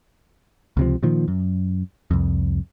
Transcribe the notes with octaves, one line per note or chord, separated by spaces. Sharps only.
C#2 C3 F3
A#2 D#3 F3
F#2
C2 F2